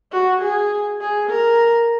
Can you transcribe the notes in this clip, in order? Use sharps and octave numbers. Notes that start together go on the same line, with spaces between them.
F#4
G#4
G#4
A#4